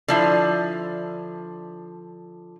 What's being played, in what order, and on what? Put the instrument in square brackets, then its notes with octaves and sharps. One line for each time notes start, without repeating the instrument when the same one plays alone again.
[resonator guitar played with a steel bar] D3 F3 E4